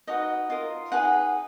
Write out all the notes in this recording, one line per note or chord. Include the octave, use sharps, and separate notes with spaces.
D#4 F#4 B4 D#5
F4 A#4 D#5
D#4 G#4 B4 F#5